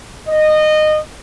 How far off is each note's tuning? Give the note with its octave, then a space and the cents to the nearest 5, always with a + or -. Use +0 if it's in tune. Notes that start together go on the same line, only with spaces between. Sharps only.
D#5 -20